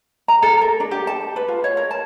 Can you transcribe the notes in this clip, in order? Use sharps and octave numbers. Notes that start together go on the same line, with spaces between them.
A#5
A4
A#4
D4
G4
A5
B4
F4
C#5
A#4
A5